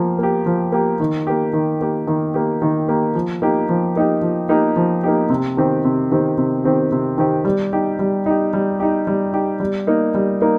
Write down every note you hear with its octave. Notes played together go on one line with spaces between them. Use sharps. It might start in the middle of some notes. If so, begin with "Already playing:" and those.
Already playing: F3 A#3 G4
A#3 G4
F3
A#3 G4
D#3
A#3 G4
D#3
A#3 G4
D#3
A#3 G4
D#3
A#3 G4
F3
A#3 D#4 G4
F3
A#3 D#4 G4
F3
A#3 D#4 G4
F3
A#3 D#4 G4
C3
D#3 C4 G4
C3
D#3 C4 G4
C3
D#3 C4 G4
C3
D#3 C4 G4
G3
D#4 G4
G3
D#4 G4
G3
D#4 G4
G3
D#4 G4
G3
A#3 D#4
G3
A#3 D#4